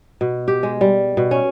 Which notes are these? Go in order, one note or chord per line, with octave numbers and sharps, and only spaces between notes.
B2
G4
G#3
G3
B2
C#4